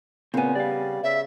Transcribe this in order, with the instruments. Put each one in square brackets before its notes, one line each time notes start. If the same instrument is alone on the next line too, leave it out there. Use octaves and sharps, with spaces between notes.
[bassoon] A#2 [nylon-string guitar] C#3 B3 [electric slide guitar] C4 G#5
[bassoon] G3 [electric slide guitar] D5 F5
[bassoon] C#3 [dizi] E5